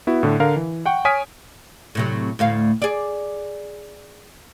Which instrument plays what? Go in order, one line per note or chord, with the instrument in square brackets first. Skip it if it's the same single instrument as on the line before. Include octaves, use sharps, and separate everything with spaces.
[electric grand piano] B3 E4 F#4
A2 D3
D3 A#4 F5
E3
F#5 G5 C#6
C#5 G#5 D#6 F6 B6 D7
[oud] A2 C3 F#3
D2 A2 F5
G#4 D5